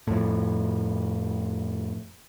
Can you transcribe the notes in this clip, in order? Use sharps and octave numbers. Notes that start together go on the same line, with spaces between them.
F2 A2